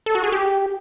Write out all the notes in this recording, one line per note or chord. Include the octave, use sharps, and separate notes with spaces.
A4
F#4
G#4
G4